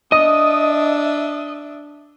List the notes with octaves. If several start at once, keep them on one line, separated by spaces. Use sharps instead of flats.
D4 D#5 E5 D#6